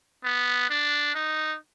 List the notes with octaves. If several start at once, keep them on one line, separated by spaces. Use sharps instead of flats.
B3
D4
D#4